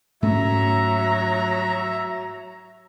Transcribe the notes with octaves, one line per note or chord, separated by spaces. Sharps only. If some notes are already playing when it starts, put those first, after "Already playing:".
G#2 F#3 A3 C#4 E5 A#5